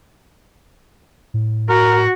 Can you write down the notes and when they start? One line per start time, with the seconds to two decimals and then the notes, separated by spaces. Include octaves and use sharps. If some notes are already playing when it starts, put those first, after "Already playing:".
1.34 A2
1.70 F#4 A#4